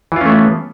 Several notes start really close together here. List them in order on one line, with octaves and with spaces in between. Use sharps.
E3 F4 C#4 A3 B3